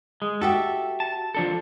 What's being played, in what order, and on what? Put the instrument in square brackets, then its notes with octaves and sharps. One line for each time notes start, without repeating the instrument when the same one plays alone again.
[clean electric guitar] G#3
[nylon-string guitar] F#4 G4 E5 [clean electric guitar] A4
[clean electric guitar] A5
F3 D4 A4